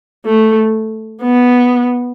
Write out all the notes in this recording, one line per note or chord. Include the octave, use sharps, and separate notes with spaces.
A3
B3